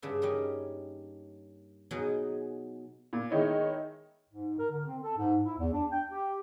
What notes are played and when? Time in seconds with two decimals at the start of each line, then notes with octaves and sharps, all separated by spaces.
0.02 G2 C#3 E5
0.22 G3 A#3 C#4 D#4
1.91 B2 F#3 D#4 G#4
3.13 A#2
3.31 D#3 G#3 D#4 E4 C#5
4.29 G#2
4.58 A#4
4.71 D3
4.87 C4
5.03 A4
5.17 G#2
5.46 E4
5.59 E2
5.74 D4
5.92 G5
6.11 G4